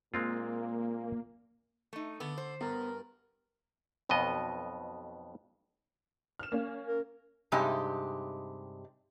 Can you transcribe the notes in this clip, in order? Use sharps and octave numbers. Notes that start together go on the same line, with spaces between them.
A#2 G#3 A#3 C4 F4
A3 D#4
D3 B3
C5
G2 B3 A#4
B1 F2 B2 B3 D#5
F6 E7
A#3 C#4
A#4
G2 C3 G#3 D#4 G4